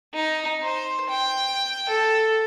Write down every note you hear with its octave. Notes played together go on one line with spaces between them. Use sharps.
D#4
C5
G5
A4